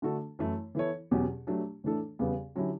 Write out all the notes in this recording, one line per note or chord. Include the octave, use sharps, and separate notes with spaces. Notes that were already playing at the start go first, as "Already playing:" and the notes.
D3 A3 D4 F#4 A4
F#2 E3 A3 E4
E3 B3 E4 A4 C#5
E2 B2 F#3 C#4 G4
F#3 A3 D4 G4
A2 E3 A3 D4 A4
E2 C#3 G3 B3
D3 F#3 C#4 E4 G4